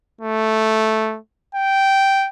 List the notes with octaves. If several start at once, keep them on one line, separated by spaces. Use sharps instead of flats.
A3
G5